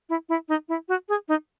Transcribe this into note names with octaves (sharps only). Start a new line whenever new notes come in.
E4
E4
D#4
E4
F#4
G#4
D#4